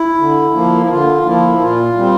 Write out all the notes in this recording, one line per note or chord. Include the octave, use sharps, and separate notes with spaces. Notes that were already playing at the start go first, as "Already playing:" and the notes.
Already playing: E4
D3
F3 A#3
E4
D3 F4
F3 A#3 E4
A#2 F4
G3 C4